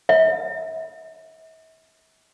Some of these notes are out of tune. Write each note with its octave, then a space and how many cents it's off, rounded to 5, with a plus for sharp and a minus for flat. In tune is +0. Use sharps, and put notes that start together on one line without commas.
E5 -40